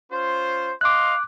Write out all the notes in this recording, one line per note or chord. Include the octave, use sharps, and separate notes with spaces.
C#4 F4 C5
D#5 F5 C6 D6 F#6